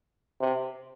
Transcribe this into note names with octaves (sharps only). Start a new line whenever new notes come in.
C3